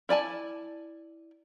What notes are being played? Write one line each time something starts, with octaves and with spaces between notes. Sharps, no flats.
E4 D5 G#5 A5